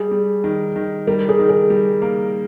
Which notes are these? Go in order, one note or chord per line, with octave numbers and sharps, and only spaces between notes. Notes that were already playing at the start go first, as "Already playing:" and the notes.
Already playing: G3 G#4
G3
D#3
D#3
G3 A#4
G#4
D#3
G#4
G3
A#3